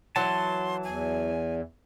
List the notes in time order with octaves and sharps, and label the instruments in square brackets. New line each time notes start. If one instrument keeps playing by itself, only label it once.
[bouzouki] E3 F#3 [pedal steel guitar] A5 [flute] C6
[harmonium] E2 [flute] G#5